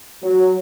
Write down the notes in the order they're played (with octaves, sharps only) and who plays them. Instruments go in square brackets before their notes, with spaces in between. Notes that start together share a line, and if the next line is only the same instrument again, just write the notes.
[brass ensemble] F#3